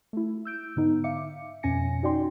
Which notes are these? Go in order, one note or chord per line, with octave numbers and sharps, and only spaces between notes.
A3 E4
E6 G6 D7
G#2 D3 B3 D#4
E5 F5 D6 C#7
F2 B2 C#4 G#5 A#6 C#7
C#4 D#4 F#4 D5 G5 C6